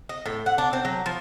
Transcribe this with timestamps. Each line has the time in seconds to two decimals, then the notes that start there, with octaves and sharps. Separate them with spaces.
0.09 D#5
0.26 A2
0.46 F#5
0.58 D4
0.73 C4
0.85 F#3
1.06 F3